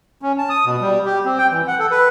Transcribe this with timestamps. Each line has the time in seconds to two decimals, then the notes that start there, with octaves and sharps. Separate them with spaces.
0.22 C#4
0.38 A5
0.49 D#6
0.65 B2
0.81 G3
1.05 G4
1.25 C4
1.38 G5
1.51 E3
1.67 F#5
1.79 A4
1.91 B4